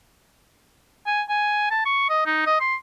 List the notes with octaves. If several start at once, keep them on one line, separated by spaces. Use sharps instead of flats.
G#5
G#5
A5
C#6
D#5
D#4
D#5
C6